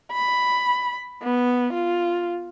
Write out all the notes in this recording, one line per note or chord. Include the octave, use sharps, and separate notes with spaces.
B5
B3
F4